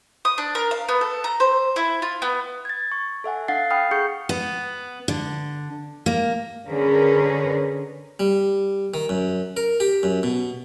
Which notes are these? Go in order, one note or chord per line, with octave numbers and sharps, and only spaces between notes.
D#6
D4
A#4
F5
B3
A4
A#5
C5
E4
F4
B3
G#6 A6
C#6
A4 E5 F#5 G#5
D4 F5 F#5 A6 C7
G5 B5 D#6 F6 C7
G#4 C#6 G6 C#7
B3
D3
A#3
D3 C#4 G#4 A#4 B4
G3
D#3
F#2
A#4
G4
F#2
B2